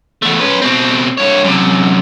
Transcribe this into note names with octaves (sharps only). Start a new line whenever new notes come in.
E2 A3
C#4 B4
B2 C4
G2 C#5
F#2 C3